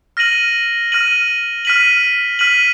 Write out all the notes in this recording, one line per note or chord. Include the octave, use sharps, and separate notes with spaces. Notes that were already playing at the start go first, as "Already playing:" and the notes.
F6 A#6 D#7 F#7
F6 A#6 D#7 F#7
F6 B6 D#7 F#7
F6 B6 D#7 F#7